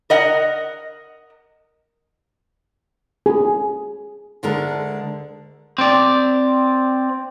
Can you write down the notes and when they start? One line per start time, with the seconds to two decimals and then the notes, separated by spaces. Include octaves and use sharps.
0.10 A#4 D#5 F#5
3.26 G#4
4.43 D2 D3 G#3 A#4
5.78 C4 D5